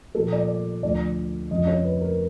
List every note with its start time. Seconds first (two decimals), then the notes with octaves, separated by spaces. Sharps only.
0.15 A#2 F3 A#3 A4
0.32 D5
0.48 D5
0.83 D2 D3 F3 D5
1.51 F2 C#3 F3 D#5
1.67 C#5
1.85 B4
2.01 A#4